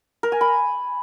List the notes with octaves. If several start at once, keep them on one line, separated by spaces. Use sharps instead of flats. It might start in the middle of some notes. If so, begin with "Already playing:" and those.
A#4
G#5
B5